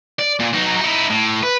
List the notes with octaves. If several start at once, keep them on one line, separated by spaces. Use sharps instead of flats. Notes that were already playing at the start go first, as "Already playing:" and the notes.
D5
A#2
F#3 D#4
D#4 E4
A2
B4